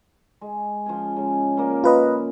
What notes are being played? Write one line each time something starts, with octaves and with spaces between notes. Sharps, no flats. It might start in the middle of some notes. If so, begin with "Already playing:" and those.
G#3
F3 C#4 G#4
C#3 G#3
A#2 A#3
A#3 F4 B4 D#5